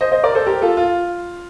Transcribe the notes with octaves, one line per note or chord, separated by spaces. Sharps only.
C5 D#5
C5 D#5
A#4 D5
A4 C5
G4 A#4
F4 A4
F4